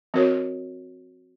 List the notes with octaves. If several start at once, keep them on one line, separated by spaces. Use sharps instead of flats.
F3 C4 F#4 A#4 C#5